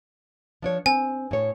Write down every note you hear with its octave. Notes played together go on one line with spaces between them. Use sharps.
F3 D4 C#5
C4 G#5
A2 C#5